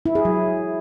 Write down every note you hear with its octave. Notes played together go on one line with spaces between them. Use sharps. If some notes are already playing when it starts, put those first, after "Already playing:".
E4
G#4
F#3